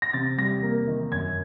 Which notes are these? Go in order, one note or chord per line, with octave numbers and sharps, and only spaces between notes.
A#6
C3 A6
G3 A#6
A#3
D#3
F#2 G#6